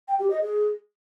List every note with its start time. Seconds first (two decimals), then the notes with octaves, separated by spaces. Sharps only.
0.08 G5
0.19 G4
0.30 D#5
0.42 G#4